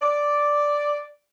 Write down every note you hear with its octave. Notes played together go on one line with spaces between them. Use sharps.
D5